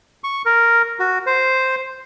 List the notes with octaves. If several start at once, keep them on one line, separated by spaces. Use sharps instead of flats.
C#6
A#4
F#4
C5